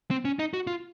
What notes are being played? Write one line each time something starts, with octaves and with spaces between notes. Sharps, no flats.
C4
C#4
D#4
F#4
F4